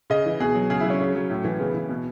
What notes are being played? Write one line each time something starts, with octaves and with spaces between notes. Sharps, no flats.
C#3 D#5
E3
B2 G#4
F#3
C#3 G#4
F#3 E4
C#4
C#3
F#3
A2
E3
C#3 B3
E3
B2